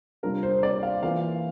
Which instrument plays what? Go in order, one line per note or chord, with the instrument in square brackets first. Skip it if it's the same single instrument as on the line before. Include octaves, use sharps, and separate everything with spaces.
[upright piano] C3 G3 D4 F4 A#4
C5
D5
F5
E3 A#3 F4 F5